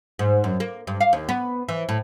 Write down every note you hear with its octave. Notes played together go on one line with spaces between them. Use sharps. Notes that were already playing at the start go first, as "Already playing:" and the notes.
G#2
F#2
A#3
G2
F5
D#2
B3
E3
A2